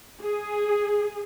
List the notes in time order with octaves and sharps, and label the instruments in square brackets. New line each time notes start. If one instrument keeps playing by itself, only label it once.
[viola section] G#4